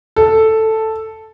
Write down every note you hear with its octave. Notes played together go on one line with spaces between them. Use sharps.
A4